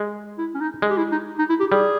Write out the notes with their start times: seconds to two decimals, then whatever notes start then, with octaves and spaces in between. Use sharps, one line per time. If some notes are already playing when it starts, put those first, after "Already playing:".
Already playing: G#3
0.38 E4
0.55 C#4
0.61 D#4
0.82 G#3
0.90 G4
0.97 E4
1.12 D#4
1.39 D#4
1.49 E4
1.60 G4
1.71 G3 G#4